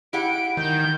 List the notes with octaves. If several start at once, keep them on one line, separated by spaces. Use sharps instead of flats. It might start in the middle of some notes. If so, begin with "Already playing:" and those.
E4 G4 F#5 D7
D#3 G6